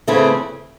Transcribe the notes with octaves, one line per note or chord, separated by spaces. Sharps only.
C#3 E3 A3 C4 E4